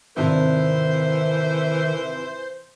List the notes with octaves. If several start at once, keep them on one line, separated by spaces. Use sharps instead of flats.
G#1 C3 D#3 E3 D4 C5